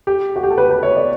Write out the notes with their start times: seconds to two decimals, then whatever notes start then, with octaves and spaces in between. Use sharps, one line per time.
0.07 G4
0.36 F#4
0.44 G4
0.50 A4
0.58 B4
0.70 B4
0.83 C#5
0.96 D5